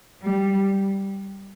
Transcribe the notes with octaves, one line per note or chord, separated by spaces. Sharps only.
G3